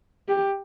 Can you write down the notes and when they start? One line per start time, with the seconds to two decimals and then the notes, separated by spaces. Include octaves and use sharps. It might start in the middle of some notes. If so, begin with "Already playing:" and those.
0.28 G4